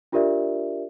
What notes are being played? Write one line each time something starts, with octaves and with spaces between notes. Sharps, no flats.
D4 F4 G4 A#4 D5 E5